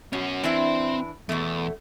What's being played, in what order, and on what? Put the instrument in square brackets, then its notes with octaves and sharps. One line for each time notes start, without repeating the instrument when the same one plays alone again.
[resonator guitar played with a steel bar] B2 [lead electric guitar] C#4 F#4
[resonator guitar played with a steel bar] E3 D4 E4 [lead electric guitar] C4
[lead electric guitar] E2 [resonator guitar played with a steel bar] B2 A3